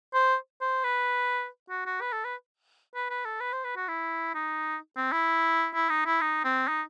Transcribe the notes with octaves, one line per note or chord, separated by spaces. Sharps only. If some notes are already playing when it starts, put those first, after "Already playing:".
C5
C5
B4
F#4
F#4
B4
A4
B4
B4
B4
A4
B4
C5
B4
F#4
E4
D#4
C4
E4
E4
D#4
E4
D#4
C4
D#4